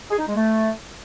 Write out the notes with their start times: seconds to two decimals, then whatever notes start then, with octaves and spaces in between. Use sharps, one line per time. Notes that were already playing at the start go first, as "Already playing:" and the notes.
0.10 G#4
0.19 D#4
0.27 G#3
0.36 A3